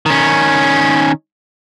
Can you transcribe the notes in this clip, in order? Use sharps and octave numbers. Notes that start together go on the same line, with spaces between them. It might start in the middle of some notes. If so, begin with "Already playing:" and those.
D#3 C#4